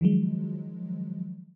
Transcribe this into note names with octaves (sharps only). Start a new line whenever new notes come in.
D#3 F3 F#3 G#3